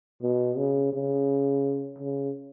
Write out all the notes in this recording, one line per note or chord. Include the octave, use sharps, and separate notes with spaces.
B2
C#3
C#3
C#3